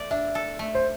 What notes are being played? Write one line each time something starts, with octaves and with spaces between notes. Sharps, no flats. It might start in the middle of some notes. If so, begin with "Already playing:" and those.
Already playing: A3 D5
D4 E5
A4
A3
C5